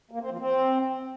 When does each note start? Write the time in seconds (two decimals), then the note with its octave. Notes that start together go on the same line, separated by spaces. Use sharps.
0.11 A#3
0.21 C4
0.30 F3
0.39 C4